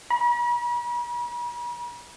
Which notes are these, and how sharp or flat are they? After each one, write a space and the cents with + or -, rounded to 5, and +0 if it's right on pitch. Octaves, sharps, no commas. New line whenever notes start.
B5 -45